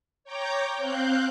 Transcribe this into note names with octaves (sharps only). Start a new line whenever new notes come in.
C#5 G5 A#5 D6 G6
C4 F5 F#6 G6